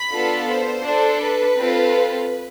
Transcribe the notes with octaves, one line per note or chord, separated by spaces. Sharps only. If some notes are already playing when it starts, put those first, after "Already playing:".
Already playing: B5
B3 D4 F4 A4
C5
D4 A4
B4
C4 F4 A4